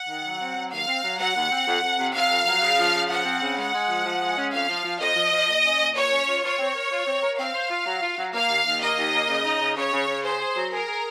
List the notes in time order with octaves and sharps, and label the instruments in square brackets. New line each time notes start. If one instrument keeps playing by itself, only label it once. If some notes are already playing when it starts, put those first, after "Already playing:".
Already playing: [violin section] F#5
[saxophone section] D#3
F#3
C4
F#3
[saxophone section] D#2 [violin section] F5
[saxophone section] C4
F#3
[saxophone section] F#3 [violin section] F#5
[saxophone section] D#2
C4
F2
F2
C3
[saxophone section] C3 [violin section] F5
[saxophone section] F2
F#3
C#3
F3
C#3
[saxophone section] F3 [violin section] F#5
[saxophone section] C4
C#3
[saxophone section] G#3 [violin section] F#5
[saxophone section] G#3
F3
F3
G#3
C#4
[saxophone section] F2 [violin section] F5
[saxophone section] F3
F3
[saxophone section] F2 [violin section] D#5
[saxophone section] F3
F3
A#2
C#4
A#2
[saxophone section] A#2 [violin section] C#5
[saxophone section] C#4
F4
[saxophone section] F4 [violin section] C#5
[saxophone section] C4
A#4
F4
C4
A#4
[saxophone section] C4 [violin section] F5
[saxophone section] C5
F4
F#3
F4
F#3
[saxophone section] A#3 [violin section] F5
[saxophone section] D#2
D#2
[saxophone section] A#3 [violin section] D#5
[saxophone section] D#2
A#3
C#3
D#4
C#3
[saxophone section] C#3 [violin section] C#5
[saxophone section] C#3
C#3
[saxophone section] G#4 [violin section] C5
[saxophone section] G#4
F#3
[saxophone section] G#4 [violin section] A#4
[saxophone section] G#4